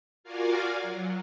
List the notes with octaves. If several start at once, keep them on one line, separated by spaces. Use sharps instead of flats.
F4 F#4 A#4 D5 F5 G#5
F#3